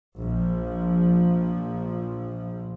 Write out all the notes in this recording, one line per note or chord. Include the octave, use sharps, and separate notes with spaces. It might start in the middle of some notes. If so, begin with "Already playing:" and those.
A#1 F3